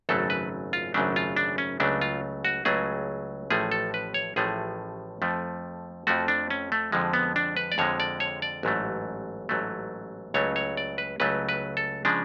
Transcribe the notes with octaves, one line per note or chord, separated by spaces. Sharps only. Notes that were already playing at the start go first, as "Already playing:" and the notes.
G#1 F#2 C#3 F#3 A3 A4
B4
F4
G#1 F#2 C#3 F#3 A3 D4
F4
D4
C#4
C#2 C#3 F#3 A3 D4
F4
F#4
C#2 C#3 F#3 A3 G#4
A1 A2 F3 A3 G#4
A4
B4
C#5
A1 A2 F3 A3 G#4
F2 F3 A3
F2 F3 A3 F#4
D4
C#4
A3
F2 D3 F3 G#3
B3
D4
B4
D5
F2 D3 F3 G#3 C#5
D5
C#5
D5
A1 G#2 F#3 A3
A1 G#2 F#3 A3
C#2 C#3 F#3 A3 C#5
C#5
D5
B4
C#2 C#3 F#3 A3 B4
B4
A4
C#3 F3 G#3 D4